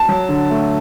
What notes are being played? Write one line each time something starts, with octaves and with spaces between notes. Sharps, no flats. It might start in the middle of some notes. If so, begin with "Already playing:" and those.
Already playing: A5
F#3
D3
A3